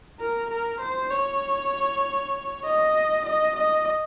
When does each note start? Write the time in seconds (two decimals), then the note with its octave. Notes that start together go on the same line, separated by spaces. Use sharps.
0.20 A#4
0.50 A#4
0.80 C5
1.11 C#5
2.65 D#5
3.25 D#5
3.56 D#5